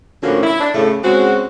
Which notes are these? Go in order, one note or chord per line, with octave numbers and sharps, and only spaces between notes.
A2 D3 F3 A#3 C#4 F#4
E4
D4
A2 C#3 A3
C#3 G#3 C4 F#4